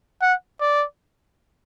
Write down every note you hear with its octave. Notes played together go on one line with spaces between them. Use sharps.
F#5
D5